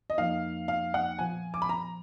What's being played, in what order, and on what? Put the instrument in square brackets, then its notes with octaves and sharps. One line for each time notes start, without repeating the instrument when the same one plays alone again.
[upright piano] D#5
[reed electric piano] F2 F3 A#3 D#4 [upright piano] F5
[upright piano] F5
F#5
[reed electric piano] A#2 F3 B3 [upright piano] G#5
[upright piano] D6
B5
A#5